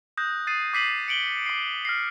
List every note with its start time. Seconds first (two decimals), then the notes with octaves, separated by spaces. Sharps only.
0.17 D#6 F#6 G6 A#6
0.47 D#6 A6 C7 D#7
0.73 D6 G6 B6 C7 D#7 F#7
1.08 C#7 D7 F#7 G7
1.46 D6 C7
1.85 F6 A#6 C7